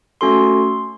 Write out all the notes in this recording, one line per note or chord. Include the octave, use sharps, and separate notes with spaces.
A3 C#4 F#4 A4 C6